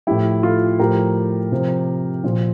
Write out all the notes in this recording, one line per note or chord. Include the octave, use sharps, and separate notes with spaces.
A2 F3 E4 G4
F4 A4
A2 F3 G4 A#4
C3 F3
A#2 F3